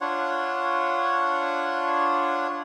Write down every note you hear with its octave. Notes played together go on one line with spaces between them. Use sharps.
D4 F4 C#5 F#5